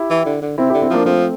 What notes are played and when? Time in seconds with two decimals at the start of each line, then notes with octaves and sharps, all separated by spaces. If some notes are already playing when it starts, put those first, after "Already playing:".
Already playing: E4 G4
0.10 E3
0.26 D3
0.42 D3
0.58 C3 C4 E4
0.70 E4 G4
0.74 D3
0.82 C4 E4
0.90 F3 A#3 D4
1.05 F3 A3 C4